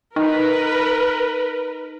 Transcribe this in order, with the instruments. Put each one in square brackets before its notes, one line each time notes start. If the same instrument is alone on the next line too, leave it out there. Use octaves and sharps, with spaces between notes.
[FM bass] D#4 [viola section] A#4 B4